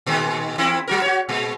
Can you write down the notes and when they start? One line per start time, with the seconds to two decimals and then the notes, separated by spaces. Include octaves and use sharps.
0.06 A#2 D#3 G#3
0.58 E2 C4 E4
0.88 F#3 F#4 A#4
1.02 F#4 C#5
1.29 A#2 G#3